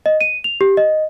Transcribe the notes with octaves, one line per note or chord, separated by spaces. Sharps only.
D#5
D#7
F7
G4
D#5